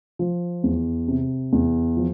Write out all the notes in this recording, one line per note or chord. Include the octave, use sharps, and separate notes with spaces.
F3
E2
C3
E2
F3